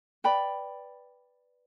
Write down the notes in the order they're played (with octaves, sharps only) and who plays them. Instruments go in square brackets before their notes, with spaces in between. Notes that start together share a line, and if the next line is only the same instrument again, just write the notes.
[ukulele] B4 D5 G5 B5